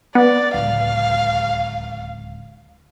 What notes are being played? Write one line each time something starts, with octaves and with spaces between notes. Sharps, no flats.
B3 D5
D1 C#2 F5